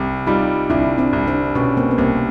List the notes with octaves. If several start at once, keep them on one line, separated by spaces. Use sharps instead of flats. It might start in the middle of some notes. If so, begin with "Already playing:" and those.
Already playing: C2
G3 D#4 F4
C2 D4 E4
C4 D4
C2
C4 D4
B2 B3 C#4
A#3 C4
B3
C2 A#3 C4